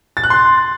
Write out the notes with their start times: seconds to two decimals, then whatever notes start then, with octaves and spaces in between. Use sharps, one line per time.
0.17 A6
0.24 F#6
0.30 C6